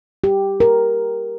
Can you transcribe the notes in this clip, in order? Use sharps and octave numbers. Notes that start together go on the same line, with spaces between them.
G4
A#4